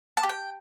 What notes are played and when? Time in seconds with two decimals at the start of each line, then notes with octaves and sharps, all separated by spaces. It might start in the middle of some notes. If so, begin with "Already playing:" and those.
0.17 A5
0.23 G4
0.29 G5